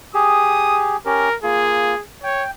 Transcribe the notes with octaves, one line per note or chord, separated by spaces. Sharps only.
G4 G#4 D#6
C#4 G4 A#4
A#3 F4 G#4
C#5 G5